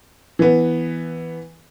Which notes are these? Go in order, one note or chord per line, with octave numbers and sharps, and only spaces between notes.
E3 B3